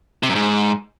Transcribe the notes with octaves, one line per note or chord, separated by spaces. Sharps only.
C3
F#2
G#2